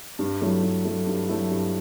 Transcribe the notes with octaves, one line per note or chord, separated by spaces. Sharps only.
G2
F#3 A3 E4
G2
F#3 A3 E4
G2
F#3 A3 E4
G2